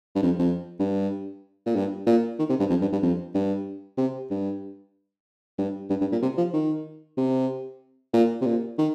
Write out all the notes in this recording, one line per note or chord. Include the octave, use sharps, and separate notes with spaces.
G2
F2
F2
G2
A#2
G2
A#2
D#3
C3
G2
F2
G2
G2
F2
G2
C3
G2
G2
G2
G2
A#2
C3
F3
D#3
C3
A#2
C3
A#2
D#3